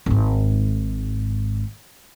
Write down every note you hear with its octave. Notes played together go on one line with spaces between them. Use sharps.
G#1 G#2